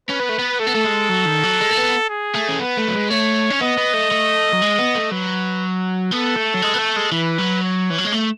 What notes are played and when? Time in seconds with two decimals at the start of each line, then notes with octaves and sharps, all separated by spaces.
0.09 C#4 B4
0.20 B3
0.29 A3
0.39 B3
0.60 A3 A4
0.67 B3
0.75 A3
0.85 G#3
1.10 F#3
1.26 D#3
1.43 F#3
1.60 G#3
1.71 A3
1.77 B3
2.10 G#4
2.35 A3
2.48 C#4
2.60 B3 B4
2.77 A3
2.88 F#3
2.94 G#3
3.10 A3 C#5
3.50 C#4
3.61 B3 D#5
3.78 B3
3.94 A3
4.11 A3
4.53 F#3
4.62 G#3
4.79 B3
4.95 A3
5.11 F#3 B4
6.12 B3 A4
6.36 A3
6.54 F#3
6.62 G#3
6.74 B3
6.78 A3
6.96 G#3
7.12 E3 B4
7.38 F#3
7.63 C#5
7.90 E3
7.99 F#3
8.05 G#3
8.13 A3